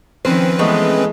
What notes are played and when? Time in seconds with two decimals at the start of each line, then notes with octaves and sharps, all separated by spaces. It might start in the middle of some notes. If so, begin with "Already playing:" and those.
0.25 D#3 F3 C4 C#4 B4 C5
0.59 E3 G#3 A3 B3